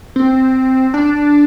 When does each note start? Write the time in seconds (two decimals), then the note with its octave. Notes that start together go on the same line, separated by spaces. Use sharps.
0.16 C4
0.94 D4